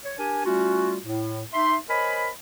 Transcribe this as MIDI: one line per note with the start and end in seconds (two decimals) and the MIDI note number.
0.04 0.15 73
0.18 0.43 62
0.18 0.43 67
0.18 0.43 70
0.18 0.43 80
0.45 0.97 55
0.45 0.97 57
0.45 0.97 61
0.45 0.97 65
0.45 0.97 66
1.04 1.42 45
1.53 1.76 63
1.53 1.76 76
1.53 1.76 84
1.90 2.29 70
1.90 2.29 72
1.90 2.29 73
1.90 2.29 75
1.90 2.29 80
1.90 2.29 83